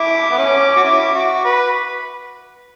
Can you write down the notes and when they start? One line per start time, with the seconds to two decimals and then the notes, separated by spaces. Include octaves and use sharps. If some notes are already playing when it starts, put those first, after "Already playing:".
Already playing: E4 D6
0.31 B3
0.38 C#4
0.76 F#4
0.84 C#4 E4
1.14 F#4
1.44 B4